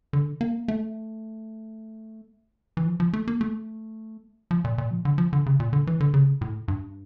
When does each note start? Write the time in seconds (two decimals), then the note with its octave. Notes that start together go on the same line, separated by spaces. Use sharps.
0.13 D3
0.41 A#3
0.68 A3
2.77 E3
2.86 F3
3.00 F3
3.13 A3
3.28 A#3
3.41 A3
4.51 F3
4.64 A#2
4.78 A#2
4.91 F3
5.05 D3
5.18 F3
5.33 D3
5.46 C#3
5.60 A#2
5.73 D3
5.87 E3
6.00 D3
6.14 C#3
6.41 A2
6.68 G2